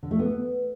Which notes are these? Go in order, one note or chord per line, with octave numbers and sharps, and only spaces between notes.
D3
A3
B3